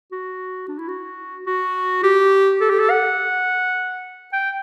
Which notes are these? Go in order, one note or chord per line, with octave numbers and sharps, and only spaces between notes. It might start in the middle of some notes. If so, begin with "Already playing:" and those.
F#4
D4
E4
F#4
F#4
G4
A4
G4
A4
F#5
G5